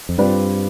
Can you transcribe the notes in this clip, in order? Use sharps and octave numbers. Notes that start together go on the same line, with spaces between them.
F2
G2 G3 C4 F4 B4 D5